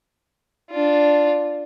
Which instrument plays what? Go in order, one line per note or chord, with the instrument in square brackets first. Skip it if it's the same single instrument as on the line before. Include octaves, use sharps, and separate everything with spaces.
[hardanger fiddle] D4 F4